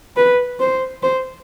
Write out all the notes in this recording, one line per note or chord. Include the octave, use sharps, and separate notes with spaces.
B4
C5
C5